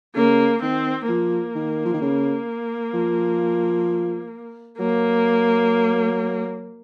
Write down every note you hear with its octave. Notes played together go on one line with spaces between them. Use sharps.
C#3 A#3
D#3 C4
F3 A#3
D#3
F3
D#3
C#3
F3
F#3 A#3